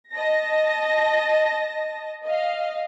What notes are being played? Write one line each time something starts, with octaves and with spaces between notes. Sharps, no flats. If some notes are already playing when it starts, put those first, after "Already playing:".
D#5 A5 A#6
D#5 F5